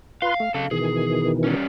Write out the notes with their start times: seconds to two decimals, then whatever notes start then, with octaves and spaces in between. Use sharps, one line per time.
0.22 F4 B4 F5 C6
0.40 A3
0.54 C#3 A4 F5
0.71 B2 D#3 E3 G#4
1.44 G3 C#4